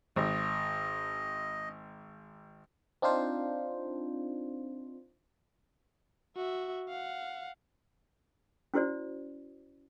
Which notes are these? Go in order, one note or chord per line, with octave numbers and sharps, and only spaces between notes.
G#1 D#5
C4 D4 D#4 F4 C5
F#4 E5
F5 F#5
C#4 E4 F#4 C5 D5